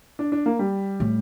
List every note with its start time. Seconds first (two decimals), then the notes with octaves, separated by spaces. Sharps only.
0.19 D4
0.32 D4
0.46 A#3
0.59 G3
1.00 A2